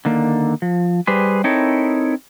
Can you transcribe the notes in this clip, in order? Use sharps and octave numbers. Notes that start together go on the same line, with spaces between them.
D3 D#3 A#3
F3
G3 G4 G#4 B4 C5
C4 D#4 E4 A4 A#4 C#5